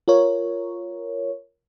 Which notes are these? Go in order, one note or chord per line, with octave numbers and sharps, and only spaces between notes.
F4 A#4 C#5